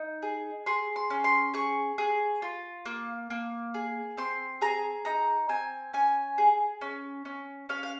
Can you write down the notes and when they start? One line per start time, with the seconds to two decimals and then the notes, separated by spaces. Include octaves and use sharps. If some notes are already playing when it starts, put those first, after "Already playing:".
Already playing: D#4
0.22 G#4
0.66 G#4 C6
0.96 C6
1.10 C#4
1.24 C6
1.54 G#4 C#6
1.98 G#4
2.42 F4
2.86 A#3
3.30 A#3
3.74 G#4
4.17 C4 C6
4.61 G#4 A#5
5.05 D#4 A#5
5.49 C4 G#5
5.93 C#4 G#5
6.38 G#4
6.81 C#4
7.25 C#4
7.69 C#4 F5
7.83 F5